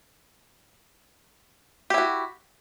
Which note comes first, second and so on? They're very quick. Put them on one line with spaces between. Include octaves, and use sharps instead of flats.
G4 E4 F#4